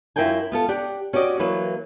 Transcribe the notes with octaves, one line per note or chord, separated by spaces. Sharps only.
F#2 E4 F4 A#4 G5 G#5
B3 F4 A4
G4 D5 F#5
C#4 F#4 G4 D5 D#5
E3 F#3 A#3 B4